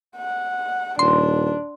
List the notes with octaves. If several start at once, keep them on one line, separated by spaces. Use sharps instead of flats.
F#5
D#1 D4 C6